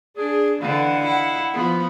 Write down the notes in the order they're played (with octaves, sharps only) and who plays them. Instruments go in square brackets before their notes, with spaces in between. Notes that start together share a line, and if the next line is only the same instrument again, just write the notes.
[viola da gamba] D4 [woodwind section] G#4
[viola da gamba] D3 E3 [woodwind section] D#5 F5 F#5
[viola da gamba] E4
F3 B3